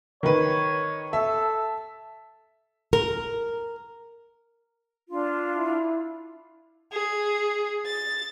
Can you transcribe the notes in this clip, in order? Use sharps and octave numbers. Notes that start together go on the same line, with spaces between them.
D#3 B4 C#5
A4 E5
A#4
D4 F4
E4
G#4
A6